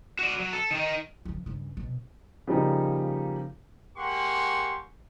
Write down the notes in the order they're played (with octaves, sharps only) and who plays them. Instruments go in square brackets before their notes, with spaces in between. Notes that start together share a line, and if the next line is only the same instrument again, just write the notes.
[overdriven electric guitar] F#4 D5
F#3
A4
D#3 D#4
[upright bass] F2 C#3
G2 C#3
F1 B2
[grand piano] C#3 F3 G3 A#3 D#4
[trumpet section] G#3 A#3 G4 F#5 C6 C#6